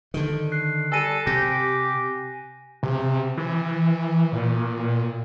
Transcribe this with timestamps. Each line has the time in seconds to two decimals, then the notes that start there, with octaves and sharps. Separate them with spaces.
0.14 D3 D#3
0.52 F#6 C7
0.92 G3 A4 G#5 A#6 D#7
1.27 C3 G4 A#6
2.83 C3
3.37 E3
4.32 A#2